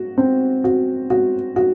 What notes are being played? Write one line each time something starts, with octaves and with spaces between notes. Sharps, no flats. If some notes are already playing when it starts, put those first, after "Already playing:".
Already playing: F#4
C4
F#4
F#4
F#4